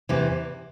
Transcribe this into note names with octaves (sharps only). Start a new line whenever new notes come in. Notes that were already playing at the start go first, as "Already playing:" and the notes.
E2 C3 E3